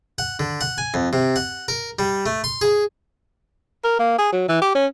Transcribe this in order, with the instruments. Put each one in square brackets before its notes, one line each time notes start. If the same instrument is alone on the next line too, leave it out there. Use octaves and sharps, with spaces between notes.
[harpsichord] F#5
D3
F#5
G#5
F2
C3
F#5
A#4
G3
A3
C6
G#4
[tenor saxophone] A#4
A#3
G#4
F#3
E3
G4
C#4